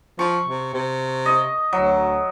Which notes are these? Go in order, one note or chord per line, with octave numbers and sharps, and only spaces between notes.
F3 C#6
C3
C3
D#5
D2 F#3